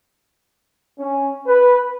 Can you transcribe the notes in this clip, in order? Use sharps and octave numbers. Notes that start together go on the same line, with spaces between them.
C#4
B4